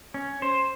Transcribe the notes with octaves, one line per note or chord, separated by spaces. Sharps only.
C#4
C5